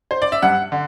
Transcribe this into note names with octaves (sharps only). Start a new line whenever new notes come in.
C5
D5
E5
G2 F#5
D3